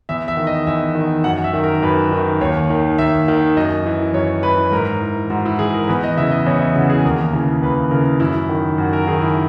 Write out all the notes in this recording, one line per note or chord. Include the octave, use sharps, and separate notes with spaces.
E2 E5
E5
D#3
D#5
E2 E5
D#3
F#2 F#5
E5
D#3
A#4
F#2 B4
D#3
D#2 C#5
D#3
D#2 E5
D#3
F#2 D#5
E3
F#2 C#5
E3 B4
G#2 A#4
E3
G#2 F#4
E4
E3 G#4
A#4
E2 B4
D#5
C#3 E3 E5
D#5
E2 C#5
E5
C#3 E3 F#4
G#4
D#2 A#4
C#3 E3
D#2 B4
C#3 E3 A#4
F#2 E4
D#3
F#2 F#4
A#4
D#3 G#4
E4